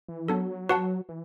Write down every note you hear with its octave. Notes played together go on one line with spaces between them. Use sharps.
E3
F#3 B3 D4 A4
F#4 B4 F#5 A5
E3